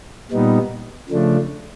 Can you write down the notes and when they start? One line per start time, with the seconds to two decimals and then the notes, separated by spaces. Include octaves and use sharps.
0.31 A#2 G3 B3 D#4
1.10 C#3 F3 A3 D4